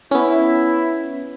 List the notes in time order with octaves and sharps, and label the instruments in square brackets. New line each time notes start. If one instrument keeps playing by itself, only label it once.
[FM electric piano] B3 C#4 [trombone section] E4